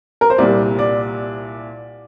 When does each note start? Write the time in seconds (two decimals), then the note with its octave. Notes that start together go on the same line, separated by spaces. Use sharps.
0.21 A#4
0.30 C5
0.38 C2 A#2 G3 D5
0.79 D5